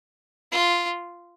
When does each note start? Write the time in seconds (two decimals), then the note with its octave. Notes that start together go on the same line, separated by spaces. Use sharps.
0.52 F4